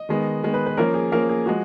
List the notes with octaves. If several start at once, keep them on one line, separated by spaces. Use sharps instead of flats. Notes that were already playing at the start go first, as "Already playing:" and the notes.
Already playing: D#5
D#3 G#3 B3
D#3 G#3 B3
B4
B4
F3 A#3 C#4 A#4
G#4
F3 A#3 C#4 A#4
G#4
F3 G#3 F#4